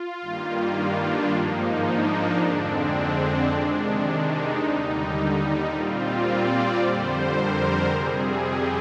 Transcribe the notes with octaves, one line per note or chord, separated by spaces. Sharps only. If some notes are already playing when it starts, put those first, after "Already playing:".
Already playing: F4
G2 D#3 G3 A#3
D4
G#2 F3 A#3 D#4
D4
F2 D3 G#3 C4
C3 D#3 G#3
D#4
D#2 D3 G3
A#2 G3 C4 F4
D5
F2 D3 G3 C5
A#4
F2 C3 G3 C4 G#4
G4